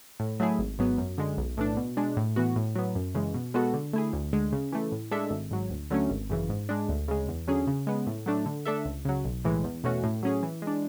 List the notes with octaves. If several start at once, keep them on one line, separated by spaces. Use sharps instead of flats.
A2
F#3 A3 E4 G#4
G#1
G#2 F#3 B3
F#2
D3 G#3
B1
A2 E3 A3 D4
B2
G#3 D4
A2
E3 B3 F#4
A2
F#3 B3
F#2
C#3 E3 G#3
B2
G#3 B3 F#4 A4
D3
A3 E4 G#4
D2
D3 G#3
C#3
E3 A3
A2
G#3 D4 A4 E5
G#1
G#2 F#3
D2
D3 F#3 A3 C#4
G#1
F#2 C#3 E3
G#2
G#3 D4
D2
C#3 G#3
E2
D3 F#3 C#4 G#4
C#3
G#3 B3
A2
F#3 A3 D4
D3
A3 D4 A4 E5
C#2
C#3 F#3
B1
A2 E3 G#3
E2
B2 A3 C#4 F#4
A2
F#3 C#4 G#4
E3
G#3 D4